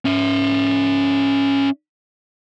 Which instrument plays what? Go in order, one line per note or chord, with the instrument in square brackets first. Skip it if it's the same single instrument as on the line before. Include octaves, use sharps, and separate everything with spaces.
[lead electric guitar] C#4 E5